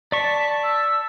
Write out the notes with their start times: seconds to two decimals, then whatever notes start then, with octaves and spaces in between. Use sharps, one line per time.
0.12 D5 A5 C#6 B6
0.63 E6